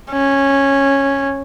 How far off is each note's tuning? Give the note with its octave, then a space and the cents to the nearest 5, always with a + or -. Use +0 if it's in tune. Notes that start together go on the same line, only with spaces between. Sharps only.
C#4 -10